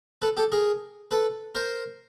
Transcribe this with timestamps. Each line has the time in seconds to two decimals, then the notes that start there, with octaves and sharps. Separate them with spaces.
0.22 A4 B4
0.37 G4 A4
0.52 G#4 A#4
1.11 A4 B4
1.55 A#4 C5